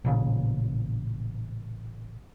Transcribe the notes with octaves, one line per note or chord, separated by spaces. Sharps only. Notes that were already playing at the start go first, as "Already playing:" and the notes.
A1 A#2 C#3